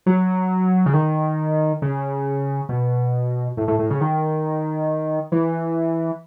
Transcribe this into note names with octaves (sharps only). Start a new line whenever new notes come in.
F#3
C#3
D#3
C#3
B2
A2
A2
A2
C#3
D#3
E3